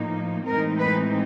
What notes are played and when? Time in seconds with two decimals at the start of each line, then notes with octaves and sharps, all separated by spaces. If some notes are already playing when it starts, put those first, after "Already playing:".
Already playing: A2 F3 A#3 D#4
0.46 A2 E3 G#3 C4 D#4 A#4
0.80 B4